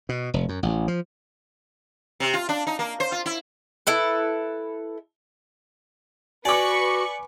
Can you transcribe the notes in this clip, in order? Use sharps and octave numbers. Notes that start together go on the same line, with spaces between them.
B2
F1
F#2
A1
F3
C3
F4
D4
D#4
A#3
C5
F4
E4
E4 A4 B4
F#4 B4 D5 G#5 B5 C#6 D6 C#7